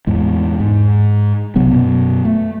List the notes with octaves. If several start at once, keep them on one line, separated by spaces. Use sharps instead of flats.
E2 A2 G#3
G#2
B1 C3 F#3 B3
F#2 B2
A3